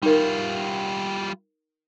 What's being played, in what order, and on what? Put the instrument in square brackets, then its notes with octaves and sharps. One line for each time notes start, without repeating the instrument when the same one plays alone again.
[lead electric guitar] G3 F4 [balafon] D#4 A#4